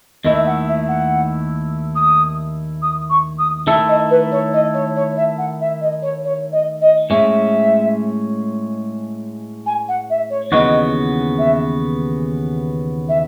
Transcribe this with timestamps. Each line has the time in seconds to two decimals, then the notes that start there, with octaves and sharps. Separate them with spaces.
0.24 D#2 D#3 A3 E4 D#5
0.36 E5
0.46 F#5
0.68 E5
0.88 F#5
1.95 D#6
2.82 D#6
3.10 C#6
3.38 D#6
3.67 D#3 A3 E4 A4 E5
3.88 D#5
4.10 B4
4.31 C#5
4.53 D#5
4.74 C#5
4.95 C#5
5.16 E5
5.38 F#5
5.60 E5
5.81 D#5
6.02 C#5
6.24 C#5
6.52 D#5
6.81 D#5
7.10 A2 G#3 C#4 E5
9.66 G#5
9.88 F#5
10.10 E5
10.30 C#5
10.52 D#2 C#3 E3 B3 F#4 D#5
11.38 E5
13.08 E5